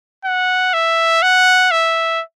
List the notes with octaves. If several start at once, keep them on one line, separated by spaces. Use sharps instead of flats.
F#5
E5
F#5
E5